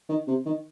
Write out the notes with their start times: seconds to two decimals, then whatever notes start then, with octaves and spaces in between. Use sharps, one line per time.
0.09 D#3
0.28 C3
0.46 D#3